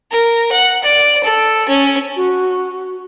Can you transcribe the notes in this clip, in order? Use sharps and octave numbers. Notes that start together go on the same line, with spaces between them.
A#4
F#5
D5
A4
C#4
F#4